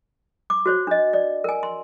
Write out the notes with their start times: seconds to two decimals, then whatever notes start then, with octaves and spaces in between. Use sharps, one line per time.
0.50 D6
0.66 F#4 C5 C#5
0.87 D4 D#5
1.13 D5
1.44 A#4 G#5
1.63 C6